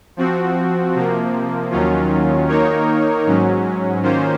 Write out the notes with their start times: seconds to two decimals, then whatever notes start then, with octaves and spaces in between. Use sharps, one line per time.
0.17 F3 C4 F#4
0.95 C3 F3 A#3
1.71 D#2 D#3 F#3 C#4 F4
2.48 D#3 A#3 D#4 A#4 C#5
3.26 G#2 F#3 C#4
4.03 D#3 A#3 C#4 F4 C5